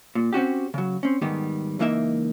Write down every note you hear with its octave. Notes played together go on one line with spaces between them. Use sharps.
A#2
C4 C#4 F#4 G4
C#3 F#3
C4 C#4
G#2 D#3 G3 B3
C#2 E3 A#3 D#4 E5